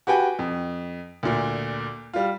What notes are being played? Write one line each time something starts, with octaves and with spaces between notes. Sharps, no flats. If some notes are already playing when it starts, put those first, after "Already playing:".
F#4 G4 B4 G5 G#5
F2
D2 A#2
G3 F4